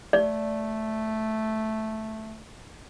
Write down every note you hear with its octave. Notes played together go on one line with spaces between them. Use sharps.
A3 D5